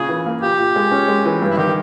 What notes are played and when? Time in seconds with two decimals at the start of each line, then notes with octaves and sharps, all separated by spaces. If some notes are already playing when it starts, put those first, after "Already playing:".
Already playing: A#2 C#3 G#4
0.09 E3
0.26 A#3
0.42 A#2 G4
0.59 A#2
0.76 G#3
0.91 C#4
1.08 G#3
1.25 E3
1.42 G2
1.50 E4
1.57 D#3 G4